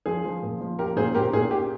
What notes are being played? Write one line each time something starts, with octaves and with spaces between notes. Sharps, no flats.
F3 G#4
F3
A#2
F3
A#3 G4 A#4
A#2 G#4 C5
A#2 G4 A#4
A#2 G#4
A#3 G4